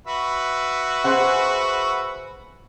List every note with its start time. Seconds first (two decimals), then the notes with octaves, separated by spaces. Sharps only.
0.07 F#4 B4 E5
1.04 G#4 C5 F#5